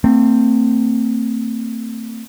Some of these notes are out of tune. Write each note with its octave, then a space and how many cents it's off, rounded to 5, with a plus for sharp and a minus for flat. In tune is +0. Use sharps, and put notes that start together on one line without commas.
A3 +45 C4 +0